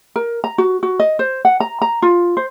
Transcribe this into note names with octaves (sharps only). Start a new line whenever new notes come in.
A#4
A#5
F#4
F#4
D#5
C5
F#5
A#5
A#5
F4
C5